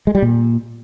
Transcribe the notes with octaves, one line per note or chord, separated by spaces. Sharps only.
G#3
G3
A#2